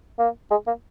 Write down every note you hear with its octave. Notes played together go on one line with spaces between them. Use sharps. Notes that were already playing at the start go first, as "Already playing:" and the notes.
A#3
G#3
A#3